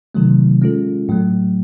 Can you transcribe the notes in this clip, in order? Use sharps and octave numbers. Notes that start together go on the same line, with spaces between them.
C3 D#3 F#3 A3
G#3 C#4 F4 A4
A2 F#3 A3